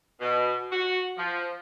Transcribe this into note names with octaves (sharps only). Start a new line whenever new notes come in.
B2
F#4
F3